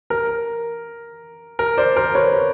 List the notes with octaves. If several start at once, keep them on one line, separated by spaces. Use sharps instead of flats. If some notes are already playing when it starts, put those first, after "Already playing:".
A#4
A#4
C5 D5
A#4 C5
B4 C#5